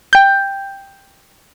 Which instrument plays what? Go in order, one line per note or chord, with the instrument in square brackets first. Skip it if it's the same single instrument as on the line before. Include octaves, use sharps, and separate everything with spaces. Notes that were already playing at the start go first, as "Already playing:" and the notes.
[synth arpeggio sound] G5 G6